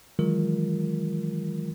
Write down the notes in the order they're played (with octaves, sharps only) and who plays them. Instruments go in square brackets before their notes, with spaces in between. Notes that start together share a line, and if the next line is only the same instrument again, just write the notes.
[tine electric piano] D#3 E3 F#3 G#3 F4 A#4